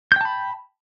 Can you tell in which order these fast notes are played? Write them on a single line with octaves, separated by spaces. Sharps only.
G6 G5 A5 B5